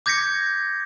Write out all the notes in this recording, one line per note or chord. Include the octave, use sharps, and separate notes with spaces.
D6 G6 G#6 A#6 B6 C#7